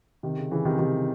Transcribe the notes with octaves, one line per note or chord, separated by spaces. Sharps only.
C3 D#3
C#3
C#3 E3
C3 D#3
C3 D#3